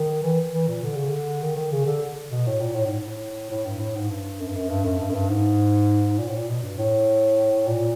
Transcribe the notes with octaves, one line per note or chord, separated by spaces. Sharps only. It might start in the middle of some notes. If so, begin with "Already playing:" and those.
Already playing: D#3
E3
E3
A#2
D3
C#3
D3
D#3
D#3
C#3
D3
B2
A2
A#2
A2
G#2
A2
A2
G2
A2
G#2
G2
F#2
G2
F#2
G2
F#2
G2
F#2
G2
G#2
A#2
A2
A#2
B2
G2
A2
A#2